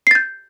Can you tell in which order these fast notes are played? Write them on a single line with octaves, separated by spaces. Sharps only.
C7 A6 G6